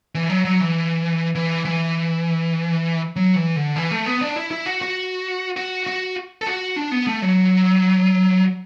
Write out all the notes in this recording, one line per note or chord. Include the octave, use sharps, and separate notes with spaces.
E3
F#3
F#3
E3
E3
E3
F#3
E3
D3
E3
A3
B3
D4
E4
E4
F#4
F#4
F#4
F#4
A4
F#4
D4
B3
A3
F#3